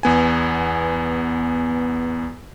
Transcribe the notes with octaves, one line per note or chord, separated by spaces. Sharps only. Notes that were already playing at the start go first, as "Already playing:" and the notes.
E2 B3 G#5